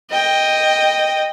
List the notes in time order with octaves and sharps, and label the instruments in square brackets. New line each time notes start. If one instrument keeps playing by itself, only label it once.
[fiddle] D#5 G5